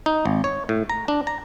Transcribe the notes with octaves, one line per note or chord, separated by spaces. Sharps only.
D#4
G#1
C#5
A2
A#5
D4
A#5